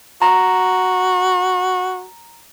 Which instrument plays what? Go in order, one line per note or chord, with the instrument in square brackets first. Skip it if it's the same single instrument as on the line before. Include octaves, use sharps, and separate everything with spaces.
[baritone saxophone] F#4 [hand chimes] A#5